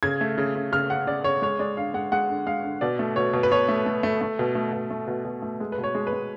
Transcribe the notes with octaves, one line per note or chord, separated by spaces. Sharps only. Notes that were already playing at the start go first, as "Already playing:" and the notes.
C#3 G#6
A3
C#3
C#3
C#3 F6
C#3 F#5
C#3 D5
C#3 C#5
G#3 C#5
G#3 D5
D3 F5
G#3 F#5
G#3 F#5
D3
G#3 F5
D3
B2 D5
A3
B2 C#5
B2
B4
B2 C#5
A3
A3
A3
A3
B2
A3
B2
A3
B2
B2
A3
G#3
B4
B2
C#5
G#3
B4
G#3